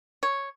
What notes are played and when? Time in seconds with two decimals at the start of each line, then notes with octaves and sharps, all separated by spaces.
0.23 C#5